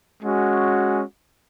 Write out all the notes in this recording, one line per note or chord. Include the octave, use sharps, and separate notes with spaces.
G#3 C#4 F#4